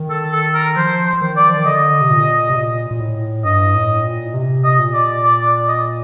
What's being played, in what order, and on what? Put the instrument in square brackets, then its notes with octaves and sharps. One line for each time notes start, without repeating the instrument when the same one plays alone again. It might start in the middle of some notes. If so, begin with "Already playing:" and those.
Already playing: [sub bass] D#3
[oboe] A4
A4
A#4
[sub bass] F3 [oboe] C5
[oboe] C5
[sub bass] F3
D#3
[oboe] D5
[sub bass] F3
D#3
[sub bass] D3 [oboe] D#5
[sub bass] C3
A#2
C3
A#2
A#2
A2
[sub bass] G2 [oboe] D#5
[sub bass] A2
A#2
C3
[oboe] D#5
[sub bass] A#2
[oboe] D5
D5
D5
D#5